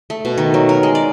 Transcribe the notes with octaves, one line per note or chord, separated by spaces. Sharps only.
A3
B2
D#3
F#3
A#4
G#3
D5